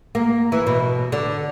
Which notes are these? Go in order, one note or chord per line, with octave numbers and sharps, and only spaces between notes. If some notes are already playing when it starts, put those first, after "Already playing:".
A#3
E3
B2
D3